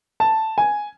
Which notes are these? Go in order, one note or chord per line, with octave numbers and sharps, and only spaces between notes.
A5
G#5